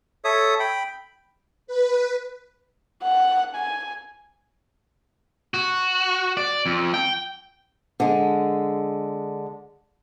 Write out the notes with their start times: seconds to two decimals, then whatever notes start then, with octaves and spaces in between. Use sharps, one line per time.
0.25 A4 C#5 E5 D#6
0.60 G5 B5
1.67 B4
3.03 F#5
3.56 G#5
5.54 F#4
6.37 D5
6.66 F2
6.94 G5
8.00 D3 G#3